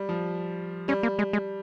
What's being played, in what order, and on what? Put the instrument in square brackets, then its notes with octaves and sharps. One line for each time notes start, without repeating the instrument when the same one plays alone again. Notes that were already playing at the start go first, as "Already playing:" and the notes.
Already playing: [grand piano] G3
F3
[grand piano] G3 [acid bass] C#4
[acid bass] A#3
G#3
G#3